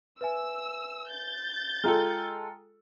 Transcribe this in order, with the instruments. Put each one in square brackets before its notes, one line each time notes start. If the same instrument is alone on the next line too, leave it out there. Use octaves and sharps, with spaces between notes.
[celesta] B4 E5 G#5 [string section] E6
[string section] G6 A6
[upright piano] G#3 F4 A4 [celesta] G5 A#5 F6